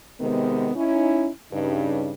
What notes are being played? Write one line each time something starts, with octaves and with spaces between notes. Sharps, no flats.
C3 D#3 G#3 B3
C#4 D#4 E4
G2 C#3 D#4